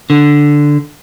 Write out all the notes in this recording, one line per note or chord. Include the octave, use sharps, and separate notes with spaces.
D3